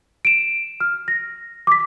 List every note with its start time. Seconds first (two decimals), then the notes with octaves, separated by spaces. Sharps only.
0.25 D7 E7
0.80 F6
1.08 A#6
1.67 D6 B6